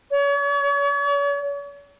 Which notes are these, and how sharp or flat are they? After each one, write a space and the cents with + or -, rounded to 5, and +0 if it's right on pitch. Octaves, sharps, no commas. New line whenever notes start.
C#5 +40